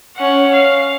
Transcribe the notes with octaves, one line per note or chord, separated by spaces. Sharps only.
C#4 F#5
F5